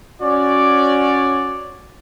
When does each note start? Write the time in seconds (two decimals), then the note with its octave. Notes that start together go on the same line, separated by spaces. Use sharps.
0.21 C#4 F#4 C#5 D5